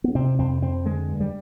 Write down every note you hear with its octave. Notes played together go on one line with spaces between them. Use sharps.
B3
C3 C4
F2 C4
F2 C4
D3 G#3
G2
G3